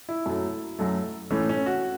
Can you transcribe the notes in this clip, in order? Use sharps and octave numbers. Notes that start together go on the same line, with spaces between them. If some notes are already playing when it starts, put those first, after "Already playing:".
E4
F#2 F#3 A3
F#2 F#3 A3
A2 E3 A3 C#4
C#4
F#4